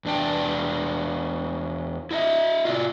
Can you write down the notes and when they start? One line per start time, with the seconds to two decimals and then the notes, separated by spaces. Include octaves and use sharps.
0.05 E2 D4 G5
2.11 E4 D#5 E5
2.65 F4 F#4 D5